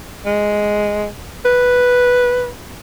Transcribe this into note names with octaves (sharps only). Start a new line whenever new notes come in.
G#3
B4